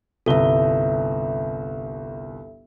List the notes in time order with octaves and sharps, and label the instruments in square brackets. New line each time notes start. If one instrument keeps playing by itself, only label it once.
[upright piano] G1 C2 G7 [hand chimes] A4 E5